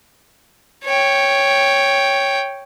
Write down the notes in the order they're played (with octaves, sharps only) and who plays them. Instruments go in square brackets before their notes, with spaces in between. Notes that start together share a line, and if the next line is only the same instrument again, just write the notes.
[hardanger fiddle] C#5 G5